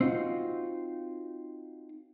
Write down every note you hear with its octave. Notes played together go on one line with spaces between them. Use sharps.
C4 D#4 F4 F#4